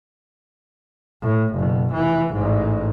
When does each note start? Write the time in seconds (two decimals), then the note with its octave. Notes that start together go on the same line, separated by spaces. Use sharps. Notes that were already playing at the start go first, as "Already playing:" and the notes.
1.22 A2
1.55 F#1 B2
1.93 F1 E3
2.34 A1 G#2